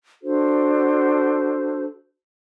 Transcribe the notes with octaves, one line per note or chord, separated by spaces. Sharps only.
D4 F#4 A4 C5